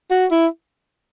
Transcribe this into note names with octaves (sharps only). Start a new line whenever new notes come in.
F#4
E4